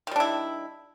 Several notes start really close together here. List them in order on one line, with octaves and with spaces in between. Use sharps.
D#3 G3 D4 E4